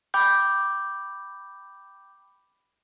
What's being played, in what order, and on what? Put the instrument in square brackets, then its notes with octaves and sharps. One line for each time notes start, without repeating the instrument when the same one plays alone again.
[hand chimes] G5 B5 D6 G6